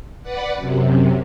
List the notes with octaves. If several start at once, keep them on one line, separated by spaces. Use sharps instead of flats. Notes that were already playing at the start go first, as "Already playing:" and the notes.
B4 D5 F#5
F#2 C3